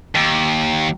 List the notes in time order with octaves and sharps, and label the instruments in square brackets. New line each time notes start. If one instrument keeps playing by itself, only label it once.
[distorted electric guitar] D#2